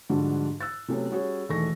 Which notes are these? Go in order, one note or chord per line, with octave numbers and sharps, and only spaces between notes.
G#2 D3 F3 G3 D4 F#4
E6 F#6 A6
C3 F#3 A3 B3 C#4
G3 C#4 F#4 G#4 C#5
E1 D#3 E3 A3 C#6 A#6